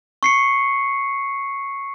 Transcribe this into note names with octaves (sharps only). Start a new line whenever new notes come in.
C#6 C7 C#7